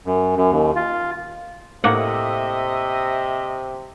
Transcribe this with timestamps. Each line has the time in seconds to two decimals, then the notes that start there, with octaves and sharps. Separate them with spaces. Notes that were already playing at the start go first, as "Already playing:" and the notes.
0.06 F#2
0.37 F#2
0.51 D#2
0.76 F4
1.84 A2 C3 A#3 D#5 E5 F#5